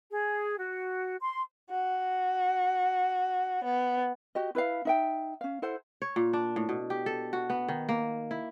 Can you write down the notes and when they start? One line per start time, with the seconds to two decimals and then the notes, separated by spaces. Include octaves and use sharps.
0.11 G#4
0.59 F#4
1.20 C6
1.71 F#4
3.64 B3
4.35 F#4 G4 D#5
4.55 E4 B4 E5 F5
4.85 D#4 E5 G5
5.41 C#4 F5
5.62 E4 A4 C5 F#5
6.02 C#5
6.16 A#2
6.33 D4
6.56 A2
6.69 B2
6.90 G4
7.06 A4
7.33 F#4
7.50 B3
7.68 D#3
7.89 A#3
8.31 E4